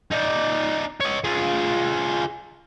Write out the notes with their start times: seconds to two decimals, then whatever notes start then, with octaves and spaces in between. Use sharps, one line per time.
0.11 D#4 D5
1.00 C#5 D#5
1.24 F4 G#4